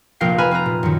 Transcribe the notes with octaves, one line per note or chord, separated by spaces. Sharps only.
F1 A#1 A#4 F5 G5 C7
B4 G#5 A#5 B5 F6
C4 F4 B4 A#5
A#2
F#2 D#3